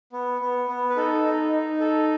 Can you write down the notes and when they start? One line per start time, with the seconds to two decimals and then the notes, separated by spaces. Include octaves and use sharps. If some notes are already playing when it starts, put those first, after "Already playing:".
0.13 B3
0.41 B3
0.69 B3
0.90 B4
0.96 D#4 A4
1.24 D#4
1.52 D#4
1.80 A4